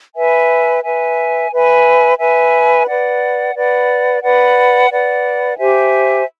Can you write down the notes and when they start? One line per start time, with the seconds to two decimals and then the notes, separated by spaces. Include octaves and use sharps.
0.15 B4 E5 G#5
0.83 B4 E5 G#5
1.50 B4 E5 G#5
2.19 B4 E5 G#5
2.86 B4 D5 F#5
3.54 B4 D5 F#5
4.22 B4 D5 F#5
4.90 B4 D5 F#5
5.58 G4 C5 E5 G#5